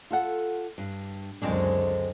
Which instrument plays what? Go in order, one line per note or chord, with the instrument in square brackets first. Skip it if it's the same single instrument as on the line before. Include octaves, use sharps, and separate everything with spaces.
[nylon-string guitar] F4 A4 F#5
G2
[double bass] C#2 F#2 [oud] D3 G#3 C4 [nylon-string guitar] D4